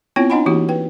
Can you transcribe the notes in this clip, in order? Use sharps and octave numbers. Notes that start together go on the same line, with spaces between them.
B3 C4 E4 F4 C#5 G5
D4 D#4 D#5 F#5 G#5 B5
E3 A#3 E4 F#4 G4
B4 G5